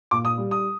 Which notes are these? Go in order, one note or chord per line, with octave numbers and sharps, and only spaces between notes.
A#2 D6
D#6
G3
D#6